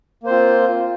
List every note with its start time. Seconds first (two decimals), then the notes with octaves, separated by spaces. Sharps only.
0.23 A#3
0.26 C5
0.29 C4
0.32 F4